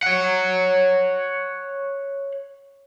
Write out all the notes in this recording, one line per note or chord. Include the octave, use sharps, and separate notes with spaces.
C#5 F#5